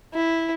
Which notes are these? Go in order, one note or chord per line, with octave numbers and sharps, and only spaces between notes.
E4